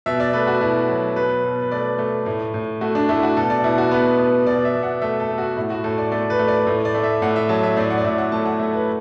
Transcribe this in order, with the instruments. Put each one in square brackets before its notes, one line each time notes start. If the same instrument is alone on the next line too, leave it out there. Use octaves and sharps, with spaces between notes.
[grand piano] B2 E5
D5
A3 B4
F#4
B2 E4
F#3
B2 B4
B2
B4
A3 D5
A3
A2
A2
A3 F#4
D4
A3 E4
F#4
B2 A4
D5
B2 E4
F#4
B3 B4
B3
B2 D5
E5
B2
F#5
A3 E5
A4
A3
F#4
A2 E4
F#4
A2 A4
D5
A3 D5
B4
A3
D5
A2
D5
A3
E5
A2 F#5
E5
F#3 A5
E5
A2 D5
F#5
D5
A2 E5
F#5
A3 A5
F#5
A3 E5
B4